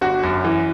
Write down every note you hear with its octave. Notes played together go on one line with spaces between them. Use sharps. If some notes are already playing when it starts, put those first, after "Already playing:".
G1 F#4
F#2
E3